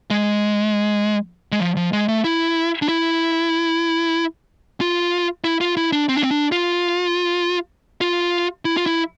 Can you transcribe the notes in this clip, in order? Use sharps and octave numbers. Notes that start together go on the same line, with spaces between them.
G#3
G#3
F3
F3
G#3
A3
E4
D4
E4
F4
E4
F4
E4
D4
C4
D4
C4
D4
F4
F4
E4
F4
E4